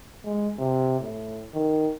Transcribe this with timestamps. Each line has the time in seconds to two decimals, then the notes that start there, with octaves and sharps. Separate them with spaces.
0.25 G#3
0.59 C3
1.00 A2
1.54 D#3